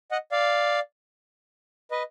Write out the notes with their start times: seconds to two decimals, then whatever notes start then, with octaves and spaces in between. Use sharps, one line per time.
0.11 D#5 F#5
0.32 D5 F5
1.91 B4 D#5